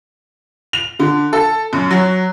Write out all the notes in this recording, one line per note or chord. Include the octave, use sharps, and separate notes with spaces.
F7
D3
A4
F#2
F#3